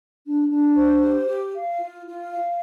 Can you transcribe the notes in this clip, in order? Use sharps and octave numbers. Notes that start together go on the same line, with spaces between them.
D4
D4
C5
G4
G4
F5
F4
F4
F5